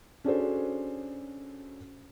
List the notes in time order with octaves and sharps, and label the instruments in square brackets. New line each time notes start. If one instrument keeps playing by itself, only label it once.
[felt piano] C#4 D4 F#4 G#4 A4 C5